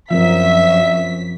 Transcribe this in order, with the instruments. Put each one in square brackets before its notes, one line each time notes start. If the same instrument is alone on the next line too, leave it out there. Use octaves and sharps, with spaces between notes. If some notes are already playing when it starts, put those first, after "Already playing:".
[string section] F#2 B6 [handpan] F3 C4 A#4 [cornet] E5